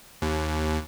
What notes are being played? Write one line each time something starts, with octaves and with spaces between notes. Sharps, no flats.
D#2